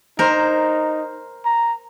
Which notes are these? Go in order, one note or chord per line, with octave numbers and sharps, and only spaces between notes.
D#4 A#4 C5
A#5